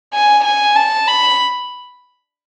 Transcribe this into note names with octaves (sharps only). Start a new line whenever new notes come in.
G#5
G#5
A5
B5